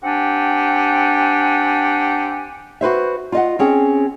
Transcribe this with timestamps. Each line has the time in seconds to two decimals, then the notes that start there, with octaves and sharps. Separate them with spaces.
0.04 C4 D4 G4 F#5 G#5
2.81 F#4 B4 C5 E5
3.32 F4 D#5 F#5
3.59 C4 C#4 G#4